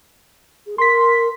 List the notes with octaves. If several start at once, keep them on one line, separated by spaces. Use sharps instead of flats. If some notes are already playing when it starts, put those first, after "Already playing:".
G#4
A#4 C6 B6